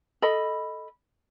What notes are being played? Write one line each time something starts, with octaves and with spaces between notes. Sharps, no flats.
A4 D#5 B5